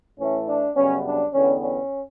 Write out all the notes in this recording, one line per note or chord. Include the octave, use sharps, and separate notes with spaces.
A2 E3 A3 C#4
D4
F#2 C#3 G3 B3 C#4
D4
E2 D3 G3 B3 C#4
C#4